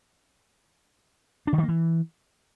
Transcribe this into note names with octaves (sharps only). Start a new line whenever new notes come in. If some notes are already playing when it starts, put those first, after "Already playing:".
D4
D3
D#3
A#3
E3